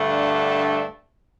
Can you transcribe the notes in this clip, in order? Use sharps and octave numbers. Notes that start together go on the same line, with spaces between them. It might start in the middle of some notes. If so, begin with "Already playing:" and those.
Already playing: G2 D3 A3 D4 A4